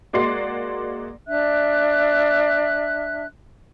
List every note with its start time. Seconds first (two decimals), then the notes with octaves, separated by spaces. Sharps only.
0.13 G#3 A#3 F#4 D5 C6 C7
1.26 D4 E5 F#6